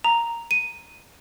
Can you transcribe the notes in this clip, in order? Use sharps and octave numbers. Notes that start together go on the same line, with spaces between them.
A#5
D#7